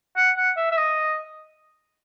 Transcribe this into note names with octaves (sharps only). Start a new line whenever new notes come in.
F#5
F#5
E5
E5
D#5